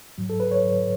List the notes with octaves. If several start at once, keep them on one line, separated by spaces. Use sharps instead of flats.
G#2 F#3
A4
B4
C#5
G#2 F#3